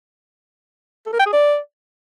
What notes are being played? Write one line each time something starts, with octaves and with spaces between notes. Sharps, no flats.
A4
A#4
G5
G#4
D5